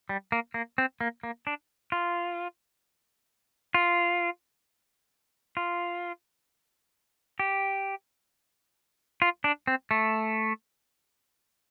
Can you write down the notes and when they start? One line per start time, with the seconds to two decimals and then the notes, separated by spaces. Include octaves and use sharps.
0.09 G3
0.32 A#3
0.54 A#3
0.78 C4
1.01 A#3
1.23 A#3
1.47 D4
1.92 F4
3.74 F4
5.57 F4
7.39 G4
9.22 F4
9.44 D4
9.67 C4
9.91 A3